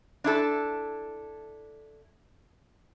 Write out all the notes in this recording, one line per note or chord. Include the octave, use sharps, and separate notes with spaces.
D4 E4 A4